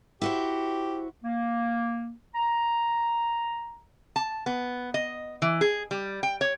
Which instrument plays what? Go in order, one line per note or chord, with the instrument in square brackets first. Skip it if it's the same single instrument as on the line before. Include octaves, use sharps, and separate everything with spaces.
[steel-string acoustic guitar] E4 F#4 C5 [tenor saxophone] G4
[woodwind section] A#3
A#5
[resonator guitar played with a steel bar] A5
B3
D#5
E3
G#4
G3
G5
C#5